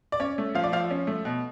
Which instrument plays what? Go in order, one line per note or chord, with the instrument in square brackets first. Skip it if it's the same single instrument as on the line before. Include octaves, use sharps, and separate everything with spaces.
[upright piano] D5
C#4 C#5
A3
F3 F5
D5
F3 F5
C#4
A3
B2